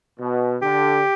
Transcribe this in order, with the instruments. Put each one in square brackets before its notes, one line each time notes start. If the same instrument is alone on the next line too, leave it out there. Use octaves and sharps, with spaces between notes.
[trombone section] B2
[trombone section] D3 [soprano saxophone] G4